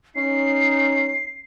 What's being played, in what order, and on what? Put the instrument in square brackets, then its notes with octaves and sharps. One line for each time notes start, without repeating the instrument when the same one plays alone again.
[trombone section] C#4 D#4 [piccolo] C7